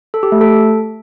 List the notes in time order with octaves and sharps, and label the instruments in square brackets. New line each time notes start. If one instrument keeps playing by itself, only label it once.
[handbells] A4
G4
A3
A4